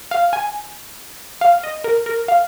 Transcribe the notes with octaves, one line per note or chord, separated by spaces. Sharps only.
F5
G#5
F5
D#5
A#4
A#4
F5